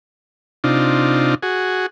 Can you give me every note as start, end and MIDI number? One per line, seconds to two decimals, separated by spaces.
0.64 1.35 48
0.64 1.35 62
0.64 1.35 63
0.64 1.35 65
1.43 1.86 66
1.43 1.86 68